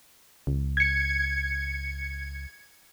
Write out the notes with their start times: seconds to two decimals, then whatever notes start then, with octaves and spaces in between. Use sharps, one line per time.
0.47 C#2
0.77 G#6 C#7